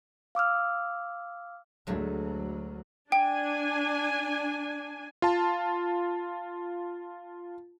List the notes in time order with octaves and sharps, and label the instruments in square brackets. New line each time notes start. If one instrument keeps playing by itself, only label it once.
[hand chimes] F5 D6 E6 F6
[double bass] D2 F#3 [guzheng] G#3 A3 D4
[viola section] D4 G#5 [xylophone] G5
[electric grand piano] F4 A5